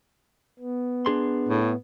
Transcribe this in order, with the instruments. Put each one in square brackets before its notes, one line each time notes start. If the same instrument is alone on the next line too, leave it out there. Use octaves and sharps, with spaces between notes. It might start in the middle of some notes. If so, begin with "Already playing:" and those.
[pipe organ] B3
[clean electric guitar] D4 G#4 C6
[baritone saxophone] A2